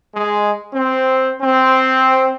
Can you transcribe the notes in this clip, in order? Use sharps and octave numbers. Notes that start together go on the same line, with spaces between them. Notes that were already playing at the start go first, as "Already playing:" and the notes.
G#3
C4
C4